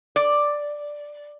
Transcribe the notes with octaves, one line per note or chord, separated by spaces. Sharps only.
D5